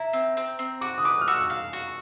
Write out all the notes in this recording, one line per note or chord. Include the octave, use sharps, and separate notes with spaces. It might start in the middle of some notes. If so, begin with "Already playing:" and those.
Already playing: E4 A#5
C4
C4
C4
F#4 D6
D#6
B4 D6
F6
F#4 E6
F5
F#4